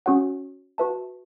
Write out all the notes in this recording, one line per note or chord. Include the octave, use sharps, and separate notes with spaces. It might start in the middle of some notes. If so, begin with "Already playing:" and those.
C#4 F#4 C#5 F#5
F#4 B4 E5 A5